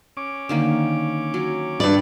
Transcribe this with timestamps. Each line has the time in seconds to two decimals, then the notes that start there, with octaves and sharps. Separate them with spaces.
0.17 C#4 D6
0.49 D3 D#3 A#3
1.34 F#3
1.80 G2 B4 D5